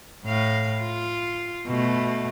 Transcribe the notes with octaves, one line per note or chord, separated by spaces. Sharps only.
A2 F5
F4
B2 A3